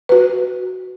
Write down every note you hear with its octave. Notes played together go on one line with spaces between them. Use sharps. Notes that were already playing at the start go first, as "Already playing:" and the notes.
F#4 B4